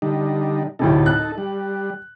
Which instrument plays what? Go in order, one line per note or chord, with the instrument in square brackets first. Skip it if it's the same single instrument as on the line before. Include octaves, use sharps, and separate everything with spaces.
[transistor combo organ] D3 G3 D#4
[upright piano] D2 A2 C3 [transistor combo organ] D#4 A4
[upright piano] F#6
[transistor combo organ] G3